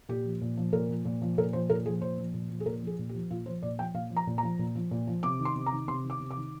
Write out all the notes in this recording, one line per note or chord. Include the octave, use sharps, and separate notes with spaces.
A#2 G4
F3
A#2
F3
A#2 A#4
F3
A#2
F3
A#2 A#4
F3 C5
A#2 A#4
F3 G#4
A#2 C5
F3
A#2
F3
G#4
A#2 A#4
F3 G#4
A#2
G4
F3
A#2 F4
F3 C5
A#2 D5
F3 G5
A#2 F5
F3
A#5
A#2
F3 A#5
A#2
F3
A#2
F3
C3 D6
D#3
C6
C3
A#5
D#3
C3 C6
D#3
D6
C3
D6
D#3